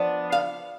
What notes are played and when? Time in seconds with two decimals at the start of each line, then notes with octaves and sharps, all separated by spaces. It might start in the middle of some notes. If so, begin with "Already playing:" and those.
Already playing: F3 B3 D4
0.32 F5